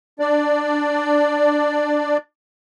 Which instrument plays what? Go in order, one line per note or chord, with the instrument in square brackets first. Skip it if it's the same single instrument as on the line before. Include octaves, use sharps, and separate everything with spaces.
[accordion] D4 D5